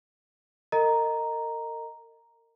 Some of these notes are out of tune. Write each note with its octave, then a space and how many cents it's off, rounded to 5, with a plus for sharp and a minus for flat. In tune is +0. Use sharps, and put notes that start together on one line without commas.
A#4 -35 D#5 -5 A#5 +0